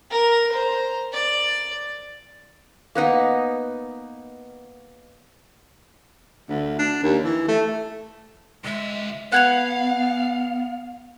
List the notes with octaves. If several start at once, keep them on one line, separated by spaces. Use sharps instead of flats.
A#4
C5 A#5
D5
A#3 B3 D#4
D2
D4
D#2
E3
A3
C#2 G#3 E5
B3 B4 F5 F#5 G#5 F#6 G#6 F7